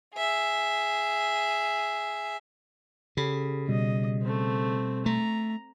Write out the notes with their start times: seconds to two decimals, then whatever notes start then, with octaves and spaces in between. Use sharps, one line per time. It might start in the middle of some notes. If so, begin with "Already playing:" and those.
0.15 G#4 E5
3.17 C#3 G4 A4 B5
3.69 B2 G3 D#5
4.22 A3 C4
5.06 A3 A#5